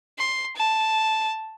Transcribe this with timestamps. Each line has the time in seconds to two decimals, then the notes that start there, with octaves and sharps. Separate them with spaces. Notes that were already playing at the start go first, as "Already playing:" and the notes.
0.18 C6
0.56 A5